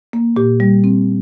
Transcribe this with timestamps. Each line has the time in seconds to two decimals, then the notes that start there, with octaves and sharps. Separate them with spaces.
0.13 A#3
0.36 A#2 G4
0.60 G3
0.84 C4